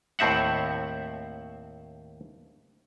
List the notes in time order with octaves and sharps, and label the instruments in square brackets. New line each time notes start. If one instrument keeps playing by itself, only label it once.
[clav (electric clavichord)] D#2 A2 C4 E5 F#5